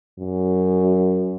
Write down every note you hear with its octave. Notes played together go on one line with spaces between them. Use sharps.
F#2